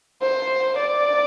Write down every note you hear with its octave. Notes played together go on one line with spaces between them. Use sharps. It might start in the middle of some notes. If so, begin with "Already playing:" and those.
C5
D5